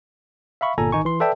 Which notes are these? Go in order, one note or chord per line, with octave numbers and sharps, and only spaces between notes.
E5 F5 B5 C#6
G1 A#2 A4 G#5 A#5
G#1 D#3 D#4 G#5 C#6
E3 C6
A4 B4 D5 E5 G5 A5